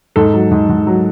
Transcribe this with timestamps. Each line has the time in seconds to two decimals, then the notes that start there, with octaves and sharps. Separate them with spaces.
0.16 G#2 A4
0.34 F#3
0.51 G#2
0.69 G#2
0.87 F#3